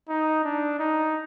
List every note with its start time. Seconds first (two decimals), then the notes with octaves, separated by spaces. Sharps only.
0.09 D#4
0.44 D4
0.79 D#4